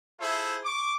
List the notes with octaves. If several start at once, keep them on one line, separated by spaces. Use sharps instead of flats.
E4 F4 G#4 A4 C5 E5
C#6 D6